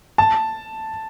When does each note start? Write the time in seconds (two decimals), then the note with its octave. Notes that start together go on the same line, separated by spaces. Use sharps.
0.18 A5